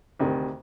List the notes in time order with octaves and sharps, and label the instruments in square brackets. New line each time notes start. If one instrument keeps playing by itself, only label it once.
[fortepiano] D2 C3 D#3